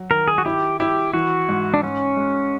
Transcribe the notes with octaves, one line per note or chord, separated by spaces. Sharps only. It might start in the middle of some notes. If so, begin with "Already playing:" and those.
Already playing: F#3
D#3 A#4
G#4
F#4
E4 G4
E4 G4
E3 F#4
G#2
D4
G#2 C#4
G#3